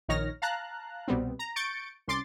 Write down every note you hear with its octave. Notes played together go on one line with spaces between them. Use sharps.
A#1 D#3 D#4 C#5 F6 A#6
F5 A5 A#5 F#6
C2 B2 G3 B3 C4
A#5
C#6 G6 A6 C#7 D7
C2 C#4 C6 D6 A6